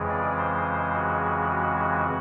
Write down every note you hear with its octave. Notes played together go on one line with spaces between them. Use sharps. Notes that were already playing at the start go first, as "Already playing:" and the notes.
Already playing: F2 C#3 E3 G#3
D5
C5
F#4
F#4